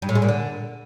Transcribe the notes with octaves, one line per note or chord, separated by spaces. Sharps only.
G2
A2
G#3
A#2
D3